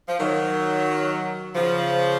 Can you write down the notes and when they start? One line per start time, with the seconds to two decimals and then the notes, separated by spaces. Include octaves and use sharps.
0.08 F3
0.19 D#3 F#3
1.55 C#3 F3